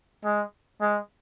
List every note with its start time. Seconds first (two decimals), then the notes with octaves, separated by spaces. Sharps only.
0.24 G#3
0.81 G#3